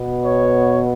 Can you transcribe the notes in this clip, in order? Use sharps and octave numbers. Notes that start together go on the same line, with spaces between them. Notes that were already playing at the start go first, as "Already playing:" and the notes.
Already playing: B2 B3
C#5